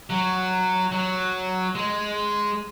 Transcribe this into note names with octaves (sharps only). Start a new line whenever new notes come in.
F#3
F#3
G#3